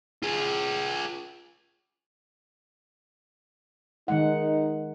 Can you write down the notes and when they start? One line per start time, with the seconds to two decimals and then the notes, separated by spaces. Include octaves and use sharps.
0.23 F4 G#4
4.08 D#3 G#3 D#4 F#5